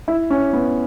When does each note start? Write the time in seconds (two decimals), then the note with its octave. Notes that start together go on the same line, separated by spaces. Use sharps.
0.08 E4
0.30 C#4
0.53 B3